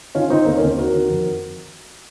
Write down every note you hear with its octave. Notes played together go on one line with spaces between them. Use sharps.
D#3 C#4 F4
D#3 C4 D#4
D#2 A#3
C#4
D#2 C4
D#3 F#4 A#4
D#3
F2